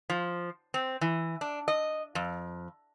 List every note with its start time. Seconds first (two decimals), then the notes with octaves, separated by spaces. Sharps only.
0.10 F3
0.74 C4
1.01 E3
1.41 D4
1.68 D#5
2.15 F2